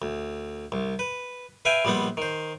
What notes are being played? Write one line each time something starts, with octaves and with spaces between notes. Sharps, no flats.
D2
C2
B4
B4 E5 F5 G5 G#5
A#1 G3 B3 C4 F#5
D#3 C5